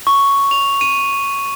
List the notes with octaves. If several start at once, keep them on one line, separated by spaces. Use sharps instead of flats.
C#6
F7
D#7